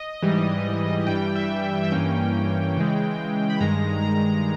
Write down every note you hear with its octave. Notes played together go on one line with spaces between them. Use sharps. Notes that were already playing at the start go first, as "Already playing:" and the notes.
Already playing: D#5
G#2 E3 G3
G2 E3 G3 G5
E5
E5
G2 E3 A#3 C#4 G5
C#3 E3 G#3
B5
G2 D#3 G#3 A#5
A#5